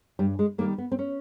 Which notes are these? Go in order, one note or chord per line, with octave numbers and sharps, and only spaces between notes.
G2 G3
G#3
D#3 G3 A#3
B3
C4
C#4